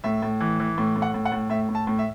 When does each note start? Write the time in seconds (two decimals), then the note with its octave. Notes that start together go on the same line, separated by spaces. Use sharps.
0.04 A2 E5
0.22 A2
0.40 E3
0.60 E3
0.78 A2
0.96 A2
1.02 F#5
1.14 A2
1.25 F#5
1.32 A2
1.50 A2 E5
1.69 A2
1.75 A5
1.87 A2
1.99 E5